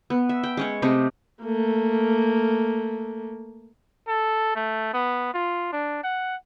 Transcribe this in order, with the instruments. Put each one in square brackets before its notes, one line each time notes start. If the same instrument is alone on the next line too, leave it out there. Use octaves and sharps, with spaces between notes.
[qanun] B3
E5
G5
G#3 C#4 C#5
C3 A3 C4 D#5
[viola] A3 A#3
[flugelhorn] A4
A3
B3
F4
D4
F#5